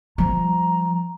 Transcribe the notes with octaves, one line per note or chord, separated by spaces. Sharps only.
F3 G3 A#5